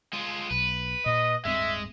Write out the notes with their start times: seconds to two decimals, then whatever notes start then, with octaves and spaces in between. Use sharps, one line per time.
0.13 G#3 F4
0.51 B1 B4
1.06 A#2 D#5
1.45 D1 G2 G#3 C4 E5